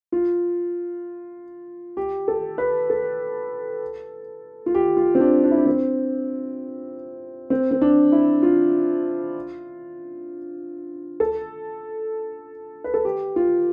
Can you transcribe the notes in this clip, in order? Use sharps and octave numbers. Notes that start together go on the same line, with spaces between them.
F4
G4
A4
B4
A4
F4
G4
F4
C4
D4
D4
E4
D4
C4
C4
C4
D4
E4
F4
A4
B4
A4
G4
F4